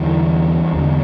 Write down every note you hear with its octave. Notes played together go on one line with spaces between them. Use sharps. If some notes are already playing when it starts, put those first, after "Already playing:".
Already playing: E2 D3 E3 G3
E2 D3